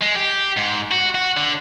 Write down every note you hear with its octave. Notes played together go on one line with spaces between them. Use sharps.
G#3
G4
G#2
F#4
F#4
D3